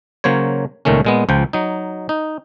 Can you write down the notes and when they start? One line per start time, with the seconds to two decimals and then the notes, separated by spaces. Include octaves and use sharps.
0.24 C#3 F#3 A#3 C5 C#5
0.85 C#2 A#2 D#3 A3 C#4
1.05 A#2 G#3 B3
1.29 C#2 F3 G5
1.53 F#3 D#4
2.09 D#4